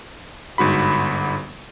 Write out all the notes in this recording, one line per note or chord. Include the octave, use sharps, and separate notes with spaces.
G1 G#2 F#4 B5